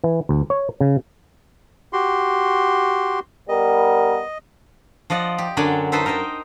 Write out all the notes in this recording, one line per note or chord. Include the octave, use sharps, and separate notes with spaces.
E3
D2
C#5
C#3
F#4 G4 C6
G3 B3 A#4 D#5
F3 D5 D#5 F#5
G4
F#2 D3 F#3 D5 G5 G#5
D#4 A4 B4 C5 E5
A#4 C5 D#5 G5